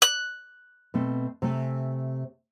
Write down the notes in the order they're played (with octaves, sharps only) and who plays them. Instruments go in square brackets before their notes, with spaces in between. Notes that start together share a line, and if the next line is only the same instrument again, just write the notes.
[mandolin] F#6
[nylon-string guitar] B2 A3 C4
C3 A3 G#5